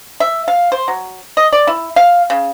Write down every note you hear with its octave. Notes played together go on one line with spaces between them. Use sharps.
E5
F5
C5
F#3
D#5
D5
E4
F5
C#3